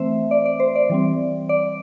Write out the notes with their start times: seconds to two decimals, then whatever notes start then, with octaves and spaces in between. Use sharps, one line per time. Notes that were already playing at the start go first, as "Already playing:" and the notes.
Already playing: E3 A3 C4 C5 E5
0.31 D5
0.46 D5
0.60 C5
0.75 D5
0.90 E3 G3 C4
1.49 D5